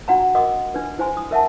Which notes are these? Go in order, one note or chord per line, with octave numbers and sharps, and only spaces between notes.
D4 F#4 F#5 G5 A#5
A#4 D#5 F#5 C6 D6 D#6
D4 B4
E4 C5 G#5 C6
D#6
A#4 E5 F#5 A5